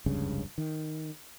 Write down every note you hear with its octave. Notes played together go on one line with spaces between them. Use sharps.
F1 C#2 G2 C#3
D#3